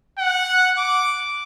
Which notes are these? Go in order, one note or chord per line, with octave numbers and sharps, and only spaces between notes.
F#5
D6